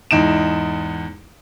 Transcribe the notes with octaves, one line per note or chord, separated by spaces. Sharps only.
E2 G#2 D#4 D7 E7